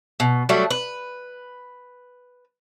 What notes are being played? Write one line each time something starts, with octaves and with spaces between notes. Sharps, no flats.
B2
F#3 G3 A3
B4